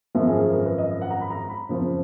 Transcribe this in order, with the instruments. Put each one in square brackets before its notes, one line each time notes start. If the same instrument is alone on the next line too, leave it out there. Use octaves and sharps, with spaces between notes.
[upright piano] G#1 F#2 F3 A#4
G#4
G#4
A#4
B4
D#5
F#5
A#5
B5
A#5
B5
F#1 F2 F3